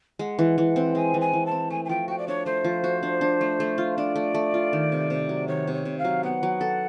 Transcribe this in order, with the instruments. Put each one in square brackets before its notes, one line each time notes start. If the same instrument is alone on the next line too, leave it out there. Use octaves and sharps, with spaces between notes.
[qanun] G#3 [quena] F#5
[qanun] E3
E3
C4
[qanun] G#3 [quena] G#5
[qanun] E3
[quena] G#5
[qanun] E3
[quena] A5
[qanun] C4
[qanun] A3 [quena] G#5
[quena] G#5
[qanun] F3 [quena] G5
[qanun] F#4 [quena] G5
[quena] D5
[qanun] D4 [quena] C#5
[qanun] A3 [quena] C5
[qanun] F3
F#4
D4
D4
A3
A3
F4
[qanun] D4 [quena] D5
[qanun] A3
A3
F4
D#3
C3
C3
F#3
[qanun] D#3 [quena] C#5
[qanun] C3
[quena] C#5
[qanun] C3
[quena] F5
[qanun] F#3
[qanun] B3 [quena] F#5
[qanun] F#3
A4